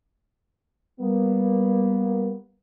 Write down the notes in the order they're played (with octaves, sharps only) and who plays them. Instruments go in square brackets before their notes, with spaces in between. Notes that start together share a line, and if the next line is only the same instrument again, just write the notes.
[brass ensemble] G3 A#3 B3